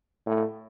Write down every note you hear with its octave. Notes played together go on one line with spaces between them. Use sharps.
A2